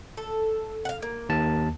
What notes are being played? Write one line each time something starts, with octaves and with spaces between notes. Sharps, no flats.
A4
F5 F#5
A#3
D#2 A5